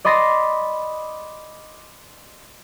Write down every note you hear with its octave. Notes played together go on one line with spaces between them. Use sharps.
D5 D#5 B5 C6 A6 A#6